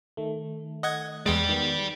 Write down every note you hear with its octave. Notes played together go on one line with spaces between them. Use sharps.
D#3 A3
D#5 F#5 G#6
E2 G#3 D5 G5
D#3 B3